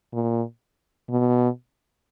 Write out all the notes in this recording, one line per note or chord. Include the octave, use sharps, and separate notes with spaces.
A#2
B2